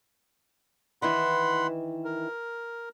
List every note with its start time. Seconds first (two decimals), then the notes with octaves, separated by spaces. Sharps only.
1.02 D#3 E3 E4 F#5 B5 C6
2.05 A#4